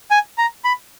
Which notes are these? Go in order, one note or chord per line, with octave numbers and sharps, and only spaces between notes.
G#5
A#5
B5